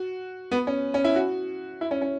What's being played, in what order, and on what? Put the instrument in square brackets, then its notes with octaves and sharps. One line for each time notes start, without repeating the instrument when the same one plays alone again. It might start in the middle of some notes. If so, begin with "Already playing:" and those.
Already playing: [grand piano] F#4
B3
C#4
C#4
E4
F#4
E4
C#4
C#4